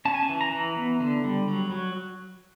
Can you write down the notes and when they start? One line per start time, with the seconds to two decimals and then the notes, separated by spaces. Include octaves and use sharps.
0.05 C#4 A5
0.14 G#5
0.23 A5
0.29 E3
0.41 A#5
0.52 E3
0.77 B3
1.00 D3
1.24 G3
1.48 F#3
1.71 F#3